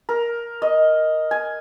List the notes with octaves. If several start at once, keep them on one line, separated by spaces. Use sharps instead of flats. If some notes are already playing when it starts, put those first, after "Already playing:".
A#4
D#5
G#5